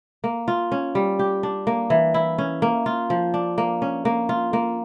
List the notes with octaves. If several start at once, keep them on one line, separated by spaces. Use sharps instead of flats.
A#3
F4
C#4
G3
G4
D4
A#3
E3
E4
C#4
A#3
F4
F3
D4
A#3
C#4
A#3
F4
A#3